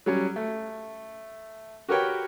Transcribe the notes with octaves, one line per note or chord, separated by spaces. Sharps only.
F#3 G3 C#4
A3
F#4 G4 A#4 B4 C#5 G5